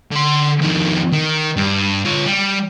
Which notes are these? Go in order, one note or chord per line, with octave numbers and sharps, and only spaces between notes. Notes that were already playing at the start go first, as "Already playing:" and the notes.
D3 C6
F2 D#3
D#3
G2
F4 C#5
G3